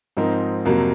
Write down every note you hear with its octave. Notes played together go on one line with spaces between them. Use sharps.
G#2 F3 C4 D#4 A#4
F2 C3 F#3 A#3